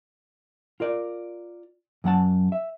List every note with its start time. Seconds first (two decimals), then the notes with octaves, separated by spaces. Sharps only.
0.80 F4 A#4 D5
2.04 F#2 F#3 F#5 A5
2.52 E5